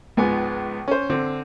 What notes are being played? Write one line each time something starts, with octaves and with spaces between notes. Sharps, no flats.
C#2 G#2 F3 G#3 B3 G#5
C#4 C5
D3 C4